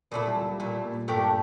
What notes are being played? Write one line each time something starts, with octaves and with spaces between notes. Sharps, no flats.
A#2 F3 A3 E4
G3
F3
G3
A#2 G3 A3 E4
A#2
G2 A3 D4 G4 A#4